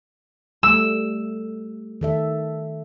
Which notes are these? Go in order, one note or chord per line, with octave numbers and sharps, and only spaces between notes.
G3 A3 E6
D#3 A4 E5